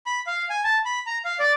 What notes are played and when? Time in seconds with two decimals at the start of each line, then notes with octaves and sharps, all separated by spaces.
0.06 B5
0.27 F5
0.50 G#5
0.64 A5
0.85 B5
1.07 A#5
1.25 F5
1.39 D5